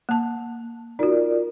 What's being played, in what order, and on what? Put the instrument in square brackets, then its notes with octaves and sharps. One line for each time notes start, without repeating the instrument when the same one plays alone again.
[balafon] A#3 A5
[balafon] D#4 F#4 [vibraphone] F4 A#4 D5